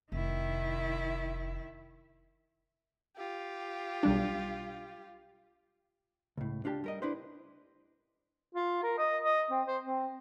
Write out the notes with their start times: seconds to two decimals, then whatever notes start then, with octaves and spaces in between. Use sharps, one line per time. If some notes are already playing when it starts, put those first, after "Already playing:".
0.12 F1 D#3 E4
3.17 F4 G4
4.03 B1 G3 D4
6.38 C#2 A2
6.64 C#2 D4 F4 G4 A5
6.84 G3 A#4 D#5
7.02 D4 E4 B4 C5
8.55 F4
8.83 A#4
8.98 D#5
9.23 D#5
9.51 C4
9.67 C5
9.83 C4